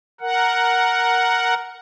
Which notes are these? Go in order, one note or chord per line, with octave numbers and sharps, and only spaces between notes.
A#4 F#5